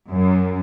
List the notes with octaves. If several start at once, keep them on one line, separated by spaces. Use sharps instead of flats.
F#2